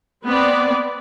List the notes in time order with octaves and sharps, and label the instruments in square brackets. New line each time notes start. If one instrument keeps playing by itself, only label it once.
[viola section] B3 C4 D5